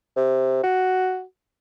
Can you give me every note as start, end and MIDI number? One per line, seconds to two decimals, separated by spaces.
0.16 0.59 48
0.63 1.23 66